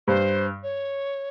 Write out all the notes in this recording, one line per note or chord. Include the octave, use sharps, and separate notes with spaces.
G2 C5
C#5